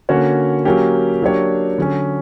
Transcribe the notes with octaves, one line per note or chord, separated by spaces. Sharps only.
D3 A#3 C#4 F#4 C#5
F#3 A#3 C#4 G4
F#3 A#3 D4 G4 C#5
D3 F#3 C#4